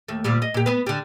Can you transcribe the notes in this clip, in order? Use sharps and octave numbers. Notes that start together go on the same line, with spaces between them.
D#2 A3
D2 A#2 G3
D#5
A#2 G4
B3 B4
D3 G3